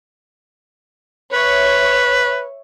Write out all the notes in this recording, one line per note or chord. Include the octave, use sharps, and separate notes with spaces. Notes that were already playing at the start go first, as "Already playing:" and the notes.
B4 C#5 E5